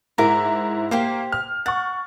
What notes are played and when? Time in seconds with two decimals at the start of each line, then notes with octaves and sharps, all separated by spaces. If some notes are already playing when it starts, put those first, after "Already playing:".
0.18 G#2 E4 A#4 D6
0.91 A#3 G4 C5 F5
1.32 F6
1.66 F#5 C#6 A6